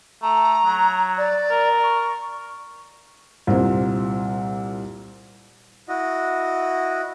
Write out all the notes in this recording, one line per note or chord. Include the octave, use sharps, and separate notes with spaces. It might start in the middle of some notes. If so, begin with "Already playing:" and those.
A3 A#5
F#3
D5
A#4
C#6
C2 A#2 C4
E4 F#4 D#5